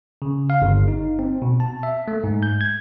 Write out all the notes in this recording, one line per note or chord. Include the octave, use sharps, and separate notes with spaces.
C#3
F5
G1
D#4
C4
B2
A5
E5
A3
G#2
G6
G#6